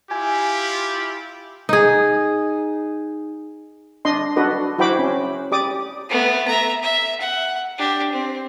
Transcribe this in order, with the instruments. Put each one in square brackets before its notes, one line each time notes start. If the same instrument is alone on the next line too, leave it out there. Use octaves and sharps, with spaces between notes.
[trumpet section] E4 F4 G4 [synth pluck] G#5
[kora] D#4 G#4
[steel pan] D4 D#5 C6
D4 F#4 A4 B4 D#5
E4 F#4 C5 G5 B5 D6
C#4
G4 D5 D6 D#6
[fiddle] A3 B3
E5 A#5
E5
F#5
D4 G4
C4